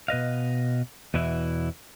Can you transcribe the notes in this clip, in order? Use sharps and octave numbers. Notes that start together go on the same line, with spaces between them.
B2 B4 D#5 F5
E2 B2 E3 E4